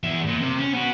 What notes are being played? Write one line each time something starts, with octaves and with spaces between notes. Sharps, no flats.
E2 E5
A#2
C3
C#4
B3 F#4